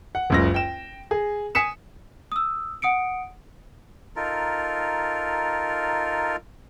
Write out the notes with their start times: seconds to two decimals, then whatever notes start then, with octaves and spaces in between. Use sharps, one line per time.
0.15 F#5
0.30 F#1 C#2 A#6
0.54 G5 E7
1.11 G#4
1.55 G#5 D#6 B6 C#7 E7
2.32 D#6 E6
2.82 F#5 D#6 C#7 D7
4.16 D#4 F4 A4 A#4